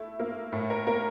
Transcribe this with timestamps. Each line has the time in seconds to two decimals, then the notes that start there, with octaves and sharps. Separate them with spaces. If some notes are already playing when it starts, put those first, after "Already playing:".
Already playing: A3 E4
0.19 A#3
0.52 A2
0.70 A#4
0.87 A#3 A#4